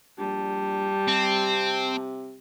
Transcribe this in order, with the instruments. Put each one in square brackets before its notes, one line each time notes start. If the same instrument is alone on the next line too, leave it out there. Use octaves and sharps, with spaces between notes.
[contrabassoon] A#1 [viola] G3 [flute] A5
[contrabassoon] C3 [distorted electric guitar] C4